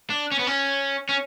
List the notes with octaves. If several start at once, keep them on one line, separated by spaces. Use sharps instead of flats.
D4
C#4
B3
C#4
C#4